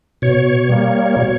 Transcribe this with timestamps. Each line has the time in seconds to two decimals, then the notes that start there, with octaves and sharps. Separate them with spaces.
0.22 B2 C#5
0.69 G3 A#3
1.16 B2